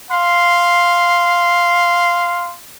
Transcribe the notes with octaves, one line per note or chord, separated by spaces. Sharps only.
F5 C6